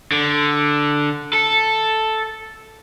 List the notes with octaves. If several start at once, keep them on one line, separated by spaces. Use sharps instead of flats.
D3
A4